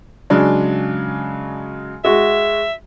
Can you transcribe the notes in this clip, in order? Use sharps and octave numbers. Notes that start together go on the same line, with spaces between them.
C#3 F#3 G#3 D4
G#3 F#4 E5